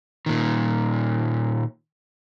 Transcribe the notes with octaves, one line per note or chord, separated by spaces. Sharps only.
A#2 D#3